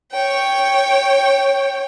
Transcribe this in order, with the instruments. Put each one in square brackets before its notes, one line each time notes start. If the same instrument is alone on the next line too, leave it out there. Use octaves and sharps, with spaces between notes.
[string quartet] C#5 G5